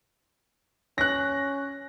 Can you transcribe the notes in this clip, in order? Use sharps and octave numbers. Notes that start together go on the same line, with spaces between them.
C#4 F#6 A#6